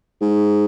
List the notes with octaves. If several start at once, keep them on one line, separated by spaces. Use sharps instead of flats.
G#2